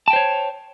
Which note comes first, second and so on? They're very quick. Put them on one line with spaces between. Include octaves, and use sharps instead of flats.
A5 G5 C5 C#5